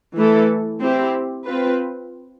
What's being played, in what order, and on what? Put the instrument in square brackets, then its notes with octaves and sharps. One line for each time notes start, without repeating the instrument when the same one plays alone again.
[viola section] E3 A3 E4 A4
C4 E4 G4
C4 F4 B4